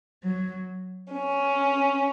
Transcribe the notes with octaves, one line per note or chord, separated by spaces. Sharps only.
F#3
C#4